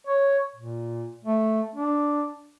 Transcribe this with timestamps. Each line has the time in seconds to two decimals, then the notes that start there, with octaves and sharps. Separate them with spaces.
0.07 C#5
0.56 A#2
1.25 A3
1.75 D4